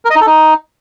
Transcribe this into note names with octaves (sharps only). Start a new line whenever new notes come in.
A#4
D#5
D#4
A4
D#4